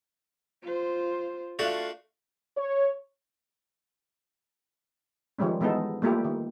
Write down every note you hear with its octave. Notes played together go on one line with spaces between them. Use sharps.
F4 C5
A3 D4 F4 F#4 F5
C#5
D#3 F3 G3 G#3 C#4
E3 G#3 B3 D#4 A4
G3 A3 A#3 E4 F4 G4
D#3